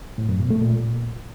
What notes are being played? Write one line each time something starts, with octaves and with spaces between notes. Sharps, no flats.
A2
F#2
B2
A3
A#2